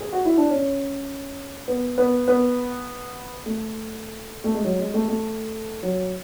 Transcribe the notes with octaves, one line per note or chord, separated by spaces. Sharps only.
G#4
F#4
E4
D4
C#4
B3
B3
B3
A3
A3
G#3
F#3
G#3
A3
A3
F#3